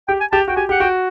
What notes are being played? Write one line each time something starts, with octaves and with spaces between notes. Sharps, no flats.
G4 G5
G#5
G4 A5
F#4 G5
G4 G#5
G4 F#5
F#4 G5